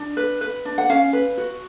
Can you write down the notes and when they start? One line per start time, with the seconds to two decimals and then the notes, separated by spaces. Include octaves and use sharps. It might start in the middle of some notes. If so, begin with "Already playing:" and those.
Already playing: D4
0.17 B4
0.41 B4
0.65 D4
0.78 F#5
0.89 C#4 F5
1.13 B4
1.38 F#4